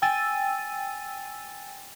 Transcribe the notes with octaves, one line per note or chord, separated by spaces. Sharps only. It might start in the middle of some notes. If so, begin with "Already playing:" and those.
G5 G#5 E6 A6 D#7